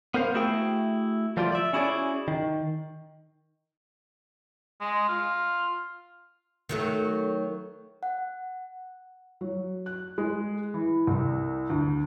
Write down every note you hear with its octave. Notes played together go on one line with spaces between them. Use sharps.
B3 A#4 C5 F5
A3 E4 F#4 G#4 G5
F3 G3 A3 F4 D5
D5 E5
C#4 E4 F#4 G#4 D5
D#3
G#3
F4
D#3 F#3 A3
F#5
F#3
F#6
G#3
E3
C2
D2